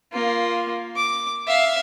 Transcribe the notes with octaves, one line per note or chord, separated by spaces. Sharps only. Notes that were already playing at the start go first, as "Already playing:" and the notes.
A#3 F4
D6
E5 F5